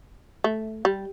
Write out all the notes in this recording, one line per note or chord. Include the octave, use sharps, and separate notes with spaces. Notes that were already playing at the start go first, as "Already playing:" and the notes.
A3
G3